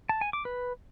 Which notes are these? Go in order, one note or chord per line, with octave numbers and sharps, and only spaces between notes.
A5
G#5
D6
B4